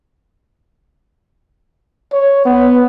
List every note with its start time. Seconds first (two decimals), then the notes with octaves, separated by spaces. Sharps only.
2.12 C#5
2.45 B3